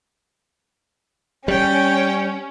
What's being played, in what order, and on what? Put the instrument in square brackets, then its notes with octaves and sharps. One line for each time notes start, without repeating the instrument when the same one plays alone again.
[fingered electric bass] G3 [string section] C#4 [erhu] G5